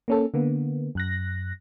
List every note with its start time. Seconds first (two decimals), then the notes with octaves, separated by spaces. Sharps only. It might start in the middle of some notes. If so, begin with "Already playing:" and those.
0.08 A#3 C#4 A4
0.34 D3 A#3 B3
0.95 F#2 F#6 A#6